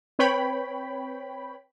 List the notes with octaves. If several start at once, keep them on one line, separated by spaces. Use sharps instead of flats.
C4 B4 C#5 G5 B5